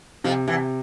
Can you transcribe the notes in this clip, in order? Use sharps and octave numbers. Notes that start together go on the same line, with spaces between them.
F2 C3 F3
E2 C3 E3